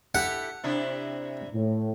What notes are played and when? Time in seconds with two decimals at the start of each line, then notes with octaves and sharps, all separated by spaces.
0.15 E4 G4 A4 F#5
0.64 C3 D4 E4
1.53 A2